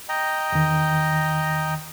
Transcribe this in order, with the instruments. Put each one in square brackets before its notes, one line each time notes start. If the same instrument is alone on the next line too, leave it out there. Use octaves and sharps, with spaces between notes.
[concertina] D#5 G5 A#5
[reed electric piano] E2 D#3